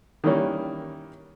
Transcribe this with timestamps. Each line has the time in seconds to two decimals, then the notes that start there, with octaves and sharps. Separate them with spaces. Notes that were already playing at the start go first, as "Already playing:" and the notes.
0.24 D#3 E3 G3 A#3 C#4